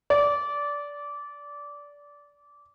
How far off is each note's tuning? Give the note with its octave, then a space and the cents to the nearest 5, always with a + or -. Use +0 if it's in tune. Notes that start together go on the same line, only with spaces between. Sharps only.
D5 -20